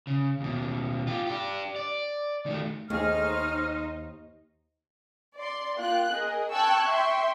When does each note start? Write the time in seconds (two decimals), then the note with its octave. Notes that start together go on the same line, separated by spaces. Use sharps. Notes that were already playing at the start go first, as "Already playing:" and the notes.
0.07 C#3
0.41 D#2 B2
1.07 F4 G4
1.27 D4 G4
1.76 D5
2.46 D#3 A3
2.90 D#2 A3 D#4 G#4 C5 F6
5.35 D5 C6
5.77 A#3 F4 G5 F#6
6.12 G#4 A#4 D#5
6.53 G5 A5 C#6 E6 F#6 G#6
6.89 E5 G5 C6 C#6